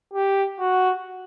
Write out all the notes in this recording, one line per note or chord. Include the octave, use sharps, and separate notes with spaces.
G4
F#4